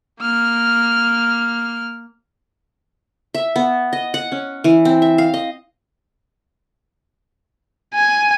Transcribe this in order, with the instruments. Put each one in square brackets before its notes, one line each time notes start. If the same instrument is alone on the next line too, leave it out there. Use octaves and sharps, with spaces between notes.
[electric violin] A#3 F6
[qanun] E5
B3
D#5
F#5
C#4
E3
C4
E5
F5
D#5
[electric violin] G#5